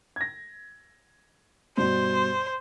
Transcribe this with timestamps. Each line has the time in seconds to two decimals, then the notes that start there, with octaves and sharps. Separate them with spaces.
0.16 G#6 A#6
1.77 G2 B2 G3 C5